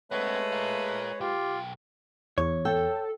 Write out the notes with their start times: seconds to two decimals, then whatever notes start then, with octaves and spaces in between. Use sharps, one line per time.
0.12 G#3 A3 B3 C4 B4 C#5
0.52 F4 A#4
1.21 B1 F4 G4 G5
2.38 E2 C#5
2.65 A4 G5